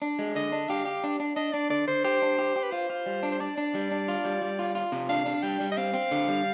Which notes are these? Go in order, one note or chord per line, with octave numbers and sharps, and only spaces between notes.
D4
G#3
D3 D#5
D4
G4 F5
G4
D4
D4
D4 D#5
D4 D5
D3 D5
D3 C5
G4 C5
D4
G4
G4
B4
F4 C5
F4
G3
D4
C5
D4 D5
D4
G3
D4
F4
G3
G3
F4
F4
C3
D4 F5
D4
G3 G5
G3
D#5
C4 F5
C4
D3
G3